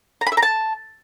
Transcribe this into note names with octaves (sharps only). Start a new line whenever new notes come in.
A#5
B5
E5
A#5
A5